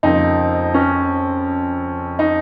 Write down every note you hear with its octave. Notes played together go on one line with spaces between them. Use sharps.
F2 C#3 F3 A#3 D#4
C#4
D#4